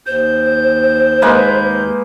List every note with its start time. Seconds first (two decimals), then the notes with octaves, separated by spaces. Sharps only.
0.07 D#2 C5 G6
1.22 G#3 A#3 B4